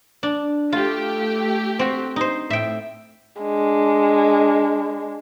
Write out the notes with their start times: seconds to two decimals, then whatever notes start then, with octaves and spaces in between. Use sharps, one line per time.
0.23 D4
0.72 A3 F4 G4
1.79 C4 F#4
2.16 D#4 C5
2.50 A2 E5 G5
3.42 G#3 D4